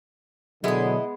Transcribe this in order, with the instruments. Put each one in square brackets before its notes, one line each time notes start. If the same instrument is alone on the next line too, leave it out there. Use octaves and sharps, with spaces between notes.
[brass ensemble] B2 D3 F#3 [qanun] G#3 B3 G#4 [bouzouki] E4 D#5